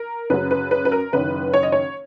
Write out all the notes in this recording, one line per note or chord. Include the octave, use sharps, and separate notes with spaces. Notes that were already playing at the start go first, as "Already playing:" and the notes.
Already playing: A#4
F#2 C#3 F#3 B4
B4
B4
B4
A#4
F#1 F#2 D#3 B4
C#5
D#5
C#5